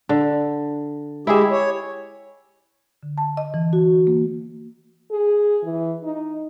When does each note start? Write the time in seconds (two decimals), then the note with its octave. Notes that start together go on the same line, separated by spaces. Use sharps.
0.09 D3
1.27 G#3 E4 G4 G#4 E5
1.51 C#5
3.03 D3
3.18 A5
3.37 D#5
3.54 E3
3.73 F#4
4.07 A#3
5.11 G#4
5.64 E3
6.04 D#4